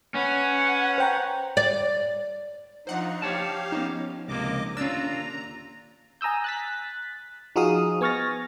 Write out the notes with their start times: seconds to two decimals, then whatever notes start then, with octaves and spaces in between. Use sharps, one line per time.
0.15 C#4 B4 C#5 F#5
0.98 C5 G5 A#5
1.57 D5
2.87 F3 D4 D#4 F4 C5 F#5
3.22 F3 G4 C#5 F5 A5
3.72 B3 C#4 D#4
4.28 C#2 C3 A#3 D#5 D6
4.77 D#2 A#2 D3 C#4 D4 F4 A#5 E6
6.21 G#5 A#5 D#6 E6 G6
6.44 F#6 A6 B6
7.56 F3 D#4 F#4 G#4 F5 D#6
8.01 B3 G#5 C#6 F6 A6 A#6